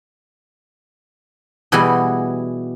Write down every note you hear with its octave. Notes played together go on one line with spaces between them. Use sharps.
B2 E3 G3 E4 F#4 G#4